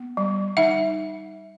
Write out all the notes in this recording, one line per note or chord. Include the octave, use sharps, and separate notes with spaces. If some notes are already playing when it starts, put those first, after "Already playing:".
Already playing: B3
G3
D#4 E5 F#5